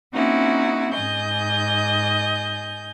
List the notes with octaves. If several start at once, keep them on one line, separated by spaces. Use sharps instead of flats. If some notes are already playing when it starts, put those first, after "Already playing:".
A#3 C4 C#4 D#4 E4 F#4
G#2 D#5 G#5 G6